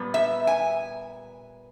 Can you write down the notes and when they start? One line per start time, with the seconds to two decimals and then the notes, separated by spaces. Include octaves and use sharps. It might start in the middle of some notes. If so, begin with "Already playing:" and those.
Already playing: A#2 G3 B3
0.14 E5
0.47 G#5